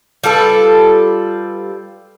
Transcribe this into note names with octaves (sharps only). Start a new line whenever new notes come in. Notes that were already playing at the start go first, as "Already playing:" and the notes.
G3 F4 A4 B4